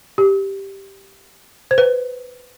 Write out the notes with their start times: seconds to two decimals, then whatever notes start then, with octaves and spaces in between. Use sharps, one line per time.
0.18 G4
1.71 C5
1.78 B4